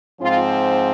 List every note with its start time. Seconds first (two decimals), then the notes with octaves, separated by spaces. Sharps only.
0.21 G#2 F3 C4 F4